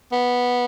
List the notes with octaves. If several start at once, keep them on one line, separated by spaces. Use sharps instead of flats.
B3